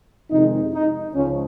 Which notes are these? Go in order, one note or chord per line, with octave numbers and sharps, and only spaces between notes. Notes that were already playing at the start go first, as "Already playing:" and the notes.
F2 C3 D#3 G#3 D#4
D#4
C#2 C#3 F3 C#4